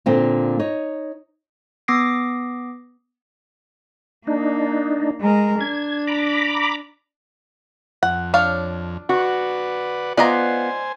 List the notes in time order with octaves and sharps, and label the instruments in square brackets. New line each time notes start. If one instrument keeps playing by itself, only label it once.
[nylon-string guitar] A#2 D3 A#3 C4
D#4 C#5
[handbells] B3 D6 D#6 A#6 C7 D7
[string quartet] A#3 [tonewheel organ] D4 D#4
[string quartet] G#3 A#4
[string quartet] D4 [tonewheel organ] G#6
[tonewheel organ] A#5 B5 D6
[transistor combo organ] F2 [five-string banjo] F#5
[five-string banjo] D4 C#5 F5
[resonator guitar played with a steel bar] F#4 [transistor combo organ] B4 D5 F#5
[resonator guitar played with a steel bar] B3 F4 [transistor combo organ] C5 G#5 [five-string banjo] D5 D#5 A#5